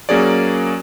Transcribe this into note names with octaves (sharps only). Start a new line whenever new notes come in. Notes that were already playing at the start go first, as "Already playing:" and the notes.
F#3 A#3 C#4 G#4 C#5 D5